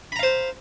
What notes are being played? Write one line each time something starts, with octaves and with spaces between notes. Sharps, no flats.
C5 F5 A#5 B5